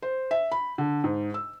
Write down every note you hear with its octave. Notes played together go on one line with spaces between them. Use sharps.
C5
E5
B5
D3
G#2
E6